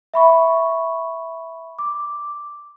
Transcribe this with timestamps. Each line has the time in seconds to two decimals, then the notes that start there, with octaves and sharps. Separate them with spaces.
0.14 E5 B5 C#6
1.79 D6